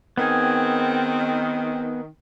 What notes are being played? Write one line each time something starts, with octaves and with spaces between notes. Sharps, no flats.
D#3 B3 C4 G#4